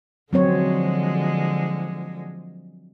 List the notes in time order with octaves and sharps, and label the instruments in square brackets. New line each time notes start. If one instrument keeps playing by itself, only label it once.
[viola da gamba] D3 F3 G#3 [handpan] F#3 C4 C#5